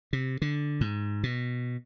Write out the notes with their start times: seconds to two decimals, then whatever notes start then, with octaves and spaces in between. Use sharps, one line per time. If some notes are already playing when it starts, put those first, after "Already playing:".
0.13 C3
0.42 D3
0.81 G#2
1.23 B2